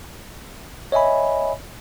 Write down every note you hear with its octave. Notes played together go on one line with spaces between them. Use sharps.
C#5 D#5 E5 G#5 B5